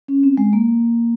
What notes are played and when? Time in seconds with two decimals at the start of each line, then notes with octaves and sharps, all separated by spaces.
0.08 C#4
0.23 C4
0.37 G#3
0.53 A#3